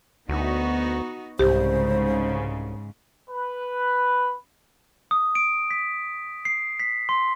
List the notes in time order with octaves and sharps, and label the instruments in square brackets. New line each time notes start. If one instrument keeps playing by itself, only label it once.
[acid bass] D2 [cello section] B3 D#4 F#4
[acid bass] C2 [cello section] G#2 C#3 [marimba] G4 [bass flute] C5
[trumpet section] B4
[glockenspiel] D#6
D7
B6
C7
B6
C6